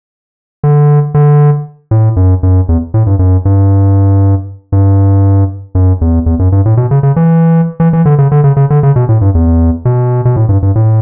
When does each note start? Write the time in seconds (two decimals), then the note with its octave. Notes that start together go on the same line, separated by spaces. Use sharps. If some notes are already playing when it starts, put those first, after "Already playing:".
0.63 D3
1.14 D3
1.91 A2
2.16 F#2
2.43 F#2
2.69 E2
2.94 A2
3.06 G2
3.19 F#2
3.45 G2
4.72 G2
5.75 F#2
6.01 E2
6.26 E2
6.39 F#2
6.52 G2
6.66 A2
6.77 B2
6.91 C#3
7.03 C#3
7.16 E3
7.80 E3
7.93 E3
8.05 D3
8.18 C#3
8.32 D3
8.44 C#3
8.57 C#3
8.70 D3
8.83 C#3
8.96 B2
9.09 A2
9.21 G2
9.35 E2
9.85 B2
10.25 B2
10.36 A2
10.49 G2
10.62 G2
10.75 A2